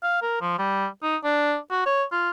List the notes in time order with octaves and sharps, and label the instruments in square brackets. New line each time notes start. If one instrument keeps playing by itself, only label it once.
[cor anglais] F5
A#4
F3
G3
D#4
D4
F#4
C#5
F4